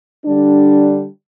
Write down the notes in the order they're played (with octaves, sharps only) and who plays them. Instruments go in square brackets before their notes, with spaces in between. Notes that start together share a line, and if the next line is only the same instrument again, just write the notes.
[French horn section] D3 G3 D4